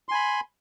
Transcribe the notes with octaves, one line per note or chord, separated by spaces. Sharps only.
G#5 B5 C6